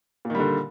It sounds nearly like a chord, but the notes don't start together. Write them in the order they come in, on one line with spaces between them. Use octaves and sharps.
A#2 D#3 G3 D3